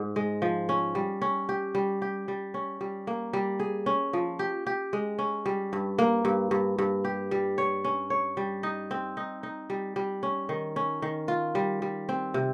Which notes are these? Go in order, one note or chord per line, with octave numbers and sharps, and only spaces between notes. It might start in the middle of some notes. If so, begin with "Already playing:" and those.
Already playing: G#2
G#3
F3
C#4
G3
C#4
G4
G3
G4
G3
C#4
G3
A#3
G3
G#4
C#4
F3
G4
G4
G#3
C#4
G3
G2
A#3
G2
G2
G2
G4
G3
C#5
C#4
C#5
G3
D#4
C4
D#4
D#4
G3
G3
C#4
D#3
C#4
D#3
F4
G3
G3
C4
C3